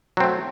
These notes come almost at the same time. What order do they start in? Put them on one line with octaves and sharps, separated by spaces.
F#3 C4 A3